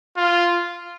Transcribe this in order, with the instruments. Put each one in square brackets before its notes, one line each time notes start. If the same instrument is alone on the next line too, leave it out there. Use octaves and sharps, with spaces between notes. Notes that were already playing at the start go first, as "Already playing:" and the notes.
[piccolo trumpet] F4